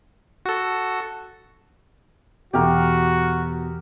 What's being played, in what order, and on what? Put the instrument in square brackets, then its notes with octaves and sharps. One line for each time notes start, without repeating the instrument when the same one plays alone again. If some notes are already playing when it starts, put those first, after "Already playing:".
[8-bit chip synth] F#4 A4
[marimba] E2 E3 A4 [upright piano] B2 [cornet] F#4 [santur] G4 A#4